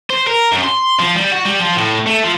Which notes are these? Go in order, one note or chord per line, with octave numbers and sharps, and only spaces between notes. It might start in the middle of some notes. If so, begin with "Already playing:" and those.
C5
A#4
F#2
C6
F3
G3
F#4
G3
F3
A2
A3
F3